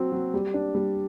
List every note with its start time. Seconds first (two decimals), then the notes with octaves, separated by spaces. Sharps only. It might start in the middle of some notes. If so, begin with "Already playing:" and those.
Already playing: F#3 C4
0.12 F#3
0.34 G3
0.54 D4
0.75 G3